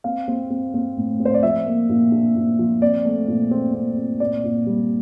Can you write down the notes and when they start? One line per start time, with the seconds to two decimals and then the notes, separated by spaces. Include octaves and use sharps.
0.04 C4 F5
0.28 C4
0.50 C4
0.74 C4
0.97 A2
1.20 C4
1.25 C5
1.34 D5
1.43 F3 E5
1.66 A#3
1.89 A#2
2.12 D4
2.36 A#2
2.59 F3
2.82 C4 D5
3.05 A3
3.28 A#2
3.51 C4
3.74 C4
3.98 C4
4.20 A#2 D5
4.44 A#2
4.67 G3